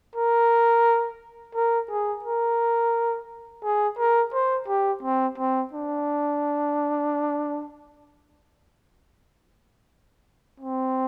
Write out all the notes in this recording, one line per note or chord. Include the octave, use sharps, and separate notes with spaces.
A#4
A#4
G#4
A#4
G#4
A#4
C5
G4
C4
C4
D4
C4